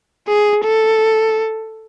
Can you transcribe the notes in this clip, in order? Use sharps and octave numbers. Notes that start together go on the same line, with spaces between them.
G#4
A4